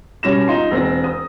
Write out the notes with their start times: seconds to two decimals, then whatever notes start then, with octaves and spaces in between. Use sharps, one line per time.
0.23 B2 G3 C#4 A#6 E7
0.48 D#4 F4 C6
0.71 E1 C4 A#6
1.04 D#6